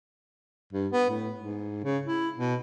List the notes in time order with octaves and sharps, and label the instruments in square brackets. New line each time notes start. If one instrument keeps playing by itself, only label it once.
[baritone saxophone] G2
B3
A2
G#2
C#3
E4
B2